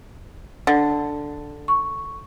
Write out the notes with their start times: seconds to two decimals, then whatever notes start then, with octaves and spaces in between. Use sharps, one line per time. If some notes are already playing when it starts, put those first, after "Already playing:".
0.67 D3
1.68 C#6